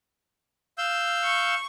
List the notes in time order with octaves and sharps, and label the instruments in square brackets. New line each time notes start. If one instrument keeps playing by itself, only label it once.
[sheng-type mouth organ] F5 E6 G6
[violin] C#6